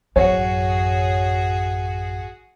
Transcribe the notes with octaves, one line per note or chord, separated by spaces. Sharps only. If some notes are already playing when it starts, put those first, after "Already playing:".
A1 F#2 F#4 G#4 C#5